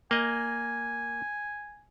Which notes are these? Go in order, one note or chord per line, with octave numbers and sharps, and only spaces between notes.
A#3 D#5 G#5